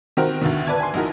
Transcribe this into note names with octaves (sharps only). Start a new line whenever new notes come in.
D#3 C4 F#4 A#4 C5
D2 B2 D3 D#3
B4 D5 A5 G#6
G#5 C6
A#1 D#4 E4 F#4 A#4